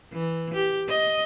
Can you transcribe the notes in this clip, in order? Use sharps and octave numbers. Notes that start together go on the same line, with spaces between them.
E3
G4
D#5